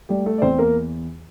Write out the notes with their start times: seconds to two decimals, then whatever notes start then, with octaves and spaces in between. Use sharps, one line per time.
0.09 G3 A3 G4
0.26 A3 A4
0.38 D5
0.42 E2 C4 C5
0.59 A#3 A#4